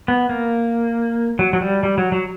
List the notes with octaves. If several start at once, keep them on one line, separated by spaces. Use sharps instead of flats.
B3
A#3
F#3
F#3
G3
G3
F#3
F#3